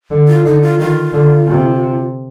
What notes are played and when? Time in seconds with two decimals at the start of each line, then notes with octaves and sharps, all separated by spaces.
0.11 D3
0.28 F4
0.45 D3 D#4
0.62 F4
0.79 D#3 F4
1.13 D3
1.47 C3